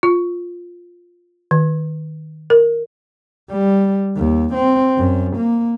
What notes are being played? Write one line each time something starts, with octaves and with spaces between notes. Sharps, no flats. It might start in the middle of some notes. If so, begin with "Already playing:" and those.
F4
D#3
A#4
G3
D#2
C4
F#2
A#3